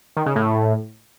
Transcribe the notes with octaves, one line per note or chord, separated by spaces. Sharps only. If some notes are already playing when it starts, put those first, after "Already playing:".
D#3
C#3
A2